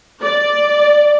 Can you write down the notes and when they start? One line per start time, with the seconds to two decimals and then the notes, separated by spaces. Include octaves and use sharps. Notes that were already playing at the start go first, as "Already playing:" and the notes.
0.22 D5